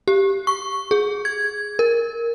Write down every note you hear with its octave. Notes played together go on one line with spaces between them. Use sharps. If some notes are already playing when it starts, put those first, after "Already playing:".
G4
C#6
G#4
G#6
A#4